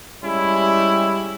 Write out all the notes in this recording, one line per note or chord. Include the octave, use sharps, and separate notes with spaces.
G3 G#3 C#4 E4